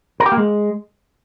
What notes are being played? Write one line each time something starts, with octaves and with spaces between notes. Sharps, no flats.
A#4
G4
A#3
G#3